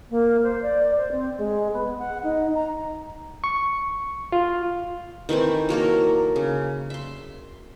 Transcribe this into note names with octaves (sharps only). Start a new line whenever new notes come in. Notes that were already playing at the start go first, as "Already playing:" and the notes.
A#3
C5
D5
C5
C4
G#3
B3
F#5
D#4
A#5
C#6
F4
D#3 E3 A3 C4
F#3 A#3 A4 A#4
C#3
E5 C6